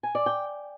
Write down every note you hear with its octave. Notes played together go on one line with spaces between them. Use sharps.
G#5
D5
G5